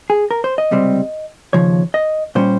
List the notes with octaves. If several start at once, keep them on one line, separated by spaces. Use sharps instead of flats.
G#4
A#4
C5
D#5
C#2 C3 G3 C4
D#2 C#3 F3 C#5
D#5
A#2 G3 C#4 C5